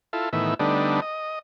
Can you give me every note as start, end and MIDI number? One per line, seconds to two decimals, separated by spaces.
0.13 0.29 64
0.13 0.29 65
0.13 0.29 69
0.33 0.54 45
0.33 0.54 51
0.33 0.54 52
0.33 0.54 59
0.33 0.54 76
0.59 1.00 50
0.59 1.00 55
0.59 1.00 57
0.59 1.00 59
0.59 1.00 62
0.59 1.00 63
1.02 1.39 75